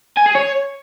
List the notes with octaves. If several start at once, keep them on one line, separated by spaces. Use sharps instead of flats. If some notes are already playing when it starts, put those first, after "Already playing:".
G#5
G#4
C#5